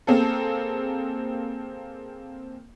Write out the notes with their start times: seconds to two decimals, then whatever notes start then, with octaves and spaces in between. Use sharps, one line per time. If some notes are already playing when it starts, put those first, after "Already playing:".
0.07 A#3 C4 G#4 A4